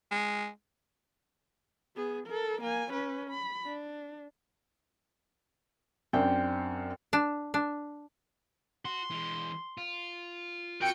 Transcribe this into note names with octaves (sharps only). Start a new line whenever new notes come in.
G#3
B3 G#4
A4 A#4
A#3 G#5
C#4 B4
B5
D4
F#2 C4 D4 G5
D4
D4
F#4 C6
E3 G#3
F4
F#4 A#4 G5 C#7 D7